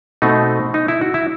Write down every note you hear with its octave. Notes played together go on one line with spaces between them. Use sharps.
B2 A3 C4 D#4
D#4
E4
F#4
E4